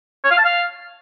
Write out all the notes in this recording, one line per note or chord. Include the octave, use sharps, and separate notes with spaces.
C#5
F5
A5
F5